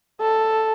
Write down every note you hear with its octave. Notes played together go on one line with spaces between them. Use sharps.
A4